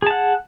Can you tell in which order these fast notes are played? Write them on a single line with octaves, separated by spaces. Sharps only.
G#4 A5 F#5